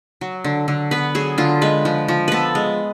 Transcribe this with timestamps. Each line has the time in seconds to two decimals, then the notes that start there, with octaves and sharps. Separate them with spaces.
0.21 F#3
0.44 D3
0.68 D3
0.91 B3 B4
1.15 F#3 G#4
1.38 D3 F4
1.62 G#3 B4
1.85 F3
2.08 F3
2.28 B3 A4 B4
2.55 G#3